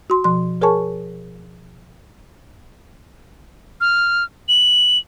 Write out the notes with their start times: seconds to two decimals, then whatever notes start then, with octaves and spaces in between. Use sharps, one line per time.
0.10 F#4 C6
0.24 B2 F3 C6
0.61 G#4 A#4 C#5 G#5 A5 C#6
3.81 F6
4.48 F#7